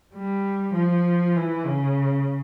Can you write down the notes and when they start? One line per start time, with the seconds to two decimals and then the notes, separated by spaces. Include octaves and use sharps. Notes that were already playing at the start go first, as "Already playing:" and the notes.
0.15 G3
0.74 F3
1.36 E3
1.66 C#3